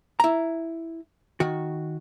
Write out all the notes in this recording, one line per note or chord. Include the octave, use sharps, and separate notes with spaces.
E4 A#5
D#3 F#4